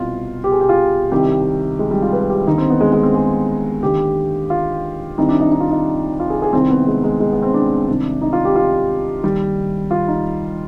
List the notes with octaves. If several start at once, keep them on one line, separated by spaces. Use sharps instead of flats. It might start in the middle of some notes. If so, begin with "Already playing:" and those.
Already playing: C2 B2 F4
G4
G#4
G4
F4
C2 C3 D#3 G4
G#3
G3
F4
B4
G4
D#2 D3 D#4
C4
B3
G#3
G#3
C4
G#4
D#2 D3 G4
F4
C2 C3 D#3 D#4
D4
D#4
D#4
F4
D#4
F4
G#4
G#4
C2 C3 D#3 C4
B3
G#3
G#3
G#3
B3
C4
D4
C2 C3 D#3
D#4
F4
G4
F4
D#2 D#3 G3
F4
D#4